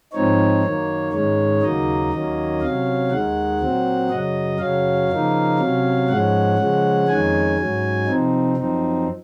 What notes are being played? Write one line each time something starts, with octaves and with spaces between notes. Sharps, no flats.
G#2 F3 C4 D#4 C#5
F#2 D#3 A#3
G#2 D#3 G#3 C#4 C#5
D#2 C#3 F#3 A#3 D#4 D#5
D#2 D#3 F#3 A#3 C#4
C3 F#3 C#4 F5
D#2 D#3 G#3 F#5
A#2 F#3 C4
F#2 C#3 F#3 D#5
F#2 C#3 F#3 C#4 F5
C#3 F3 A#3 D#4
C3 F#3 C#4
G#2 F3 G#3 C#4 F#5
C#3 F3 G#3 C#4
F2 D#3 G#3 C#4 G#5
G#2 F#3 C#4
C3 F3 C4 D#4
F#2 F3 C4 D#4